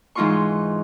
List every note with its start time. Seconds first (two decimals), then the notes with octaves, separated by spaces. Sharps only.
0.15 G#2 E3 D#4 F4 C6 C#6